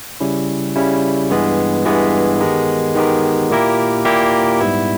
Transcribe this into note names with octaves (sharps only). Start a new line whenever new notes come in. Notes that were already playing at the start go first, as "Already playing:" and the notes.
C#3 G3 C#4 E4
C#3 G3 C#4 E4
G2 E3 G#3 B3
G2 E3 G#3 B3
D#3 G#3 B3 G4 A#4
D#3 G#3 B3 G4 A#4
A#2 A#3 E4 G4 A#4
A#2 A#3 E4 G4 A#4
G#2 G3 B3 E4